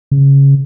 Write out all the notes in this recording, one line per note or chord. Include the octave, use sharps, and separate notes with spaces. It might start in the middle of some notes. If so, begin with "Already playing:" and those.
C#3